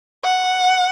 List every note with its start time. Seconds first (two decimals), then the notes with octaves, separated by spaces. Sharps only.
0.24 F#5